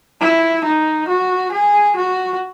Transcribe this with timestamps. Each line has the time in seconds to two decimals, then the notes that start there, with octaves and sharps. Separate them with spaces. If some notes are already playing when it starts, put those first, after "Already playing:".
0.21 E4
0.64 D#4
1.08 F#4
1.52 G#4
1.96 F#4